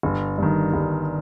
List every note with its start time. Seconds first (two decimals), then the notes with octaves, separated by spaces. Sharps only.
0.03 G1
0.38 G2 D#3
0.74 G1